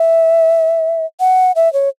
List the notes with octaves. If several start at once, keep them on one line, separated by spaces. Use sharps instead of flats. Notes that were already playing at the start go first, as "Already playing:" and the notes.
Already playing: E5
F#5
E5
C#5